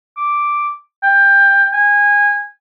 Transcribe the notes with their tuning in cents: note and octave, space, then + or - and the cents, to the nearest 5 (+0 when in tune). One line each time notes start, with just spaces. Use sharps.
D6 +0
G5 +20
G#5 -20